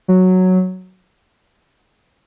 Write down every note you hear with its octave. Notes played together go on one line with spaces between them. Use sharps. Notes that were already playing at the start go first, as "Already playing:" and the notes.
F#3